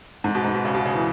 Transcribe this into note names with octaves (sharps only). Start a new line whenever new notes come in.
G#2
B2
G#2
B2
C#3
B2
C#3
E3